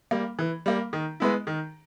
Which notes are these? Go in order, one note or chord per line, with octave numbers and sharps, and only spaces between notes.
G3 A#3
E3
G3 A#3
D#3
G#3 B3 E4
D#3